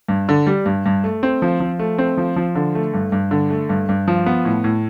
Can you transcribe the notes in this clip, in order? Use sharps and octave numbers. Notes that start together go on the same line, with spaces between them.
G2
D3
G3
G2
G2
A3
C4
F3
F3
A3
C4
F3
F3
D3
A3
G2
G2
D3
A3
G2
G2
F3
B3
A2
A2